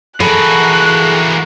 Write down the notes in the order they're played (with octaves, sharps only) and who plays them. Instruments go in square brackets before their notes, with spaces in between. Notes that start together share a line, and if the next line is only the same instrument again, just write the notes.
[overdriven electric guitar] E3 B5 [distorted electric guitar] A#3 F#4 [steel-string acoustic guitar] G#4 A4 [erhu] F#6